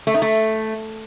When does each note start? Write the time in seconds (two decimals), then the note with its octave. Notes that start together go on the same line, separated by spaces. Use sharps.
0.07 A3
0.14 D#4
0.22 A3